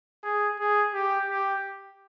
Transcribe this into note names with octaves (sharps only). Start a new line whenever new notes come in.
G#4
G#4
G4
G4